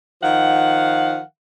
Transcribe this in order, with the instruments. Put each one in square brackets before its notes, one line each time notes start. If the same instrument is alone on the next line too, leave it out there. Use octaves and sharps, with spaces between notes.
[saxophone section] D#3 F3 F5 F#5